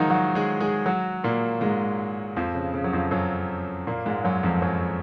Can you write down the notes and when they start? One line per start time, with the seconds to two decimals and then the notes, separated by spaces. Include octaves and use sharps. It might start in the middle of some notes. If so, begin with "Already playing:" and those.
Already playing: D#3 F3 F#3 G#3 D#4 F4 F#4
0.10 F#3 F#4
0.35 G#3 G#4
0.60 G#3 G#4
0.86 F#3 F#4
1.24 A#2 A#3
1.61 G#2 G#3
2.36 F2 F3
2.55 C#3
2.74 C#3
2.84 F#3
2.93 F2 F3
3.11 F#2 F#3
3.87 A#2 A#3
4.05 G#2 G#3
4.24 F#2 F#3
4.43 F2 F3
4.62 F#2 F#3